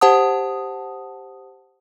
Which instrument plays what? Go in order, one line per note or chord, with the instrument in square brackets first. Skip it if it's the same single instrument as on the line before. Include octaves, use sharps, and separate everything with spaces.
[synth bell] G4 C5 F#5 A5 D#6